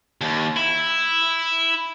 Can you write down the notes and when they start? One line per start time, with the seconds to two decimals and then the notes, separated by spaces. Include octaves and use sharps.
0.21 D#2
0.57 E4